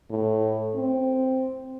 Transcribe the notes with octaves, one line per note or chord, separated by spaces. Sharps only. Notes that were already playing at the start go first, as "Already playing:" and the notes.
A2
C4